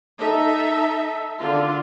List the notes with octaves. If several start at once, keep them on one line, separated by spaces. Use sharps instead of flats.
D#4 A4 E5
D3 F4